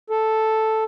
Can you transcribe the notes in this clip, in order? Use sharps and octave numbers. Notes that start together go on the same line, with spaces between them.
A4